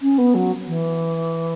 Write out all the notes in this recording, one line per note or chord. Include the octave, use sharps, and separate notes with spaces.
C#4
B3
F#3
E3